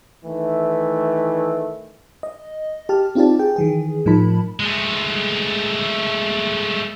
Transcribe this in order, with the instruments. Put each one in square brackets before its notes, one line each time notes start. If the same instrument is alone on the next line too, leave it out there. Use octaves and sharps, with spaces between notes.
[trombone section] D#3 E3 A3
[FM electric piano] D#5
G4 A5 F6
C4 D#4 F4 G4 D5 A5
G#4 G5
D#3 E3 G#4
A2 F3 D#4 A#4 A5 B5
[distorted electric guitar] G#3 A3